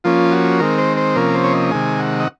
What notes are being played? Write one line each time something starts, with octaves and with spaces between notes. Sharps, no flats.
F3 A#3 C#4 F4
F#4
D#3 G#3 C4 A#4
C5
C5
C3 F3 A#3 C#4 A#4
C5
C#5
D#5
C3 D#3 G#3 G#5
F#5
D#5